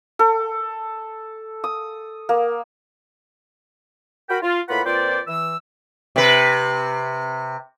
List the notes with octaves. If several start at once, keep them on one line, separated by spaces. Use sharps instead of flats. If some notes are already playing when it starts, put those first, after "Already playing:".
A4
D#6
A#3
F#4 A#4 G5 B5
F4
A2 A#3 F4 B4 F#5 B5
A#2 C4 F4 B4 C5 D5
E3 E6
C3 B4